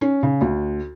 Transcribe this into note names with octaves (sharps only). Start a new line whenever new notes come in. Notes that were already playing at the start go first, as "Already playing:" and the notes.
C#4
C#3
D2